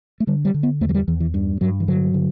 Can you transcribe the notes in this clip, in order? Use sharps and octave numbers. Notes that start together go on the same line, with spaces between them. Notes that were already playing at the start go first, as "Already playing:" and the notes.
A3
D3 G3
G3
D3
B3
E2 A3
F#3
G3
E2 E3
E3
G2
G2 F#3
E3
D3 F#3
D3